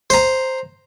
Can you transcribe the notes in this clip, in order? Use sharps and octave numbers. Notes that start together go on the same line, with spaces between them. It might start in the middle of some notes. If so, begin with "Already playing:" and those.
C5 A#5